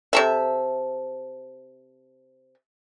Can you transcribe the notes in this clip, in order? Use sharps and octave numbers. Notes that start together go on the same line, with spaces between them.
C3 A4 E5